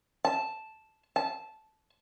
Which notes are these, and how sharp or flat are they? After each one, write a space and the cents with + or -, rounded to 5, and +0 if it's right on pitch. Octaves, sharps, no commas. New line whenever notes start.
A5 -5
A5 -15